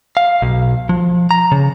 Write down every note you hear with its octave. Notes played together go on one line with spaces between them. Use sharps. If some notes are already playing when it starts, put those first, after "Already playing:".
F5
B1
F3
A#5
C#3